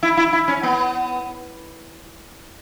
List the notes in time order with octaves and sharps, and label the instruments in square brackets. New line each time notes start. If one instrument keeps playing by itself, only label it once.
[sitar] E4
E4
E4
C#4
B3